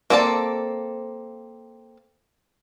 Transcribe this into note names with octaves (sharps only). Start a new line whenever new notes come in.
A#3 C4 A4 D5 A5